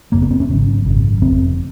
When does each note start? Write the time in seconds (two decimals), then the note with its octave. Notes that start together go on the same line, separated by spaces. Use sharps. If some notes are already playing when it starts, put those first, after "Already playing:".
0.12 F#1 F#2 C#3 A#3
0.22 B3
0.31 C4
0.40 C#4
0.49 G#1 F#2 C#3
0.86 G#1 F#2 C#3
1.22 F#1 F2 C3 C4